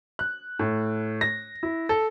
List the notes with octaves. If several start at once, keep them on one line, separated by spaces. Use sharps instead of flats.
F#6
A2
A#6
E4
A4